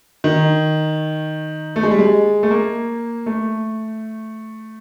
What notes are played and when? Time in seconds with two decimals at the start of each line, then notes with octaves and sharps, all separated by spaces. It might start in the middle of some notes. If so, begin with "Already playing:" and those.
0.24 D#3
1.76 A3
1.83 G#3
1.91 G3
1.99 G#3
2.43 A3
2.51 A#3
3.26 A3